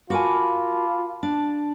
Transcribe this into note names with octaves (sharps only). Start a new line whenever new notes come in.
F4 F#4 A#4 G#5 A5 B5 D6
D4 A5